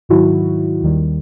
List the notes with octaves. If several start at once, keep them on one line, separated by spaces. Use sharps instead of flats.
G#2 D#3 F#3 E4 F#4
D#2 D#3 G3